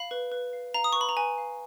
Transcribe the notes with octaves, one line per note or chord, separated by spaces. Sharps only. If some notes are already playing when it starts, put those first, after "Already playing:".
Already playing: F5 B5
B4
B4
F5
F5 A#5
D#6
C#6
B4
B5
A#5
B4 G#5
F5